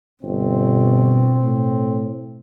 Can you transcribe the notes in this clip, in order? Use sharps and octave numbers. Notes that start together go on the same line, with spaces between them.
G1 B2 C4
A2